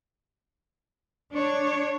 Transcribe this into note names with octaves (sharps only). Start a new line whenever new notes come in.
D4 C#5